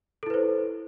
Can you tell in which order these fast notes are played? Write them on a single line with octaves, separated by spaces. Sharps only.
A4 E4 B4 C5